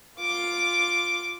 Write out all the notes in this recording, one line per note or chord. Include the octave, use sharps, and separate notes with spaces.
F4 D6